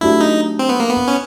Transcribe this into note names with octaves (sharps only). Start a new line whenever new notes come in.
F#3 A3 D4 E4 G4
D#4
C4
B3
A#3
B3
C#4